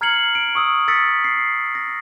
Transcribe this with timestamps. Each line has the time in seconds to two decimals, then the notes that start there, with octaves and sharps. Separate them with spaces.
0.01 A#5 F6 G#6 C7 C#7 F#7
0.35 D7
0.55 C#6 D#6 E6
0.88 E6 A6 B6 C#7
1.24 C7
1.75 A#6